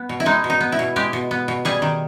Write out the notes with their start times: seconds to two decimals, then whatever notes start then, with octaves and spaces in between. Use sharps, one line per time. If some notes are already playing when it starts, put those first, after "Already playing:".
Already playing: B3
0.09 B2
0.20 E4
0.26 G#3 D#4
0.44 B2
0.50 D#4
0.60 B3
0.72 E4
0.79 B2
0.96 G#3 G4
1.13 B2
1.31 B3
1.48 B2
1.65 G3 G#4
1.82 D#3